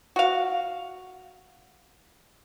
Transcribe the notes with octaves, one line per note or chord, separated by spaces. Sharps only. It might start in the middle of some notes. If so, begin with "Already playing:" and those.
F#4 F5